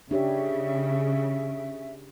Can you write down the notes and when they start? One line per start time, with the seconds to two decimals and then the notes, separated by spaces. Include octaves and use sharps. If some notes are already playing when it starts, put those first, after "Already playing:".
0.11 C#3 D4 G4 C#5 E5